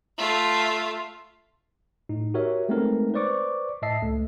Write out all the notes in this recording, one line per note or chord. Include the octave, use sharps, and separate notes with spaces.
A3 F4
A2 D#4
F#4 G4 A#4 C#5 E5
G#3 A3 B3 C4 D#4 A#4
B4 C5 D5 C#6 D6
A2 D#5 E5 A5 C7
C#2 A3